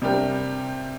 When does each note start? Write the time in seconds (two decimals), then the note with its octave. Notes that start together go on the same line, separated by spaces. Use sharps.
0.02 C3 G3 D4 G4 A#4